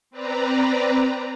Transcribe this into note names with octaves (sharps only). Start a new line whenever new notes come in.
C4 B4 D5 A#5